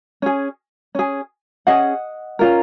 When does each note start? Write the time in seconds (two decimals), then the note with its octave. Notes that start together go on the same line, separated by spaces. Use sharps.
0.22 C#4 G#4
0.95 C#4 G#4
1.67 C#4 G#4 D#5 F#5
2.39 C#4 F4 A#4